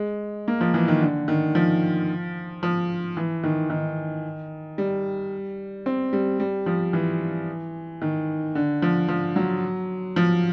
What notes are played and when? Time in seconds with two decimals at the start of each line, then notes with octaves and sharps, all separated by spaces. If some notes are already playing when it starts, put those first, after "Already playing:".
Already playing: G#3
0.48 A#3
0.61 F3
0.74 E3
0.88 D#3
1.01 D3
1.28 D#3
1.55 F3
2.63 F3
3.17 E3
3.44 D#3
3.70 D#3
4.78 G3
5.86 C4
6.13 G3
6.40 G3
6.66 F3
6.93 E3
8.02 D#3
8.55 D3
8.82 F3
9.08 F3
9.36 F#3
10.16 F3